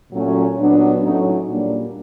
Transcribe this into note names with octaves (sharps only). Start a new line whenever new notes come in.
A#2 F#3 A3 C#4
A#2 F#3 B3 D4
A2 F#3 A3 C#4 D#4
A#2 G3 A#3 D4